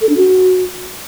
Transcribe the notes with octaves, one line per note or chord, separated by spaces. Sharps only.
A4
D4
F#4